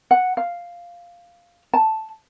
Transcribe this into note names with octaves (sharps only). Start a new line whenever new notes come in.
F#5
F5
A5